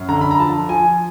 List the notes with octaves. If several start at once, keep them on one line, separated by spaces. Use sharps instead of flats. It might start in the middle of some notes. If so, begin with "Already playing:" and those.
Already playing: F#2
D3 A#5
B5
A#5
F3 A5
F3 G#5